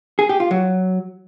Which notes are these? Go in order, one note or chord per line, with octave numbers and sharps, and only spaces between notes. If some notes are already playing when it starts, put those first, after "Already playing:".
G#4
G4
F4
F#3